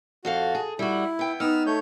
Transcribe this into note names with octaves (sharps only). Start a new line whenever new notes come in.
F2 F#4 A4 F5
G#4
G3 E4 F#4
B3 G5
B3 D#4 E6 F6
A3 C#5 G6